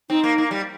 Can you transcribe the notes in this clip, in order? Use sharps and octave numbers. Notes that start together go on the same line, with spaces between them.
C4 D#4
A#3
A#3
G3